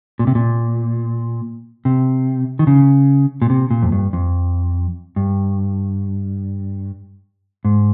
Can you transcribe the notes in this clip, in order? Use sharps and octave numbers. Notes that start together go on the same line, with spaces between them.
A#2
C3
A#2
C3
D#3
C#3
A#2
C3
A#2
F2
G2
F2
G2
G#2